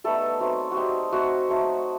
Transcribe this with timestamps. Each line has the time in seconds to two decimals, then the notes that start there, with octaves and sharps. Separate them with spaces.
0.04 G3 A3 B3 D#4 A4
0.40 F#3 A3 C4 D#4
0.71 F#4
0.77 G3 C4 D#4 G4
1.12 A3 C4 D#4 F#4 F#5
1.49 F#3 A3 C4